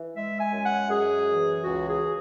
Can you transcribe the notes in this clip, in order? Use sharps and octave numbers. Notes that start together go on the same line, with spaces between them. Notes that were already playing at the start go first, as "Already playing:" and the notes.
Already playing: E3
G#3 E5
G#5
F#2
F#5
F#2 G#4
E3
C#2 F#4
G#4